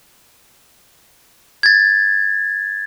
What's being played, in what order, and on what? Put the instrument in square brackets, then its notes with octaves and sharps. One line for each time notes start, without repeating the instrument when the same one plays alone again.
[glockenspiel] G#6 A6